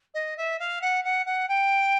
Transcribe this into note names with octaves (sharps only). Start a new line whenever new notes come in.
D#5
E5
F5
F#5
F#5
F#5
G5